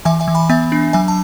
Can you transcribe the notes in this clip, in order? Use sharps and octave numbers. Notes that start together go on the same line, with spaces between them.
E3 E5 G#5
E5 G#5
E3
G#5 B5
B3 E5 G#5
D4
F#3 E5 G#5
A5